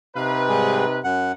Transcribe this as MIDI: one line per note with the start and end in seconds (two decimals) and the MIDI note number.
0.16 0.99 48
0.16 0.99 63
0.16 0.99 71
0.16 0.42 77
0.48 0.85 44
0.48 0.85 55
0.48 0.85 68
1.04 1.32 42
1.04 1.32 78